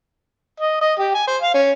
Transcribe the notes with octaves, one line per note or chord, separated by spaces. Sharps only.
D#5
D#5
G4
G#5
C5
F5
C#4